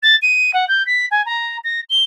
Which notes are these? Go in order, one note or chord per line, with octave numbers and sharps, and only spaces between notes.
A6
D#7
F#5
G6
B6
G#5
A#5
A#6
G7